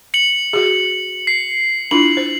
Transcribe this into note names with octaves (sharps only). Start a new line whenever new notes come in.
C#7 F#7
F#4 G#4
C7
D4 E4 F4 F#7
C5